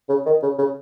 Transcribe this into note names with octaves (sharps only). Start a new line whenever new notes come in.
C#3
D#3
C#3
C#3